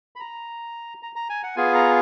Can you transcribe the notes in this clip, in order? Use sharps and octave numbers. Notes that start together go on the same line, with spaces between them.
B5
A#5
A#5
A#5
G#5
F#5
B3 F4 G#4 G#5
A#5